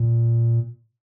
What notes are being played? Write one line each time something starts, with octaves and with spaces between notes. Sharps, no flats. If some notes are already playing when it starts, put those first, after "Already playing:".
Already playing: A#2